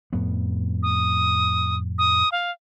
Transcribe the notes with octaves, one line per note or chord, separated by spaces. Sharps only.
F2 A2 B3
D#6
D#6
F5